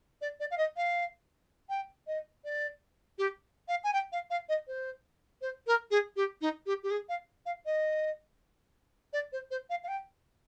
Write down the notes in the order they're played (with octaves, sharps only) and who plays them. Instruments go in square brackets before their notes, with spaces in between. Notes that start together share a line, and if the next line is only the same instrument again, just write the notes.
[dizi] D5
D5
F5
D#5
F5
G5
D#5
D5
G4
F5
G#5
G5
F5
F5
D#5
C5
C5
A#4
G#4
G4
D#4
G4
G4
G#4
F5
F5
D#5
D5
C5
C5
F5
F5
G5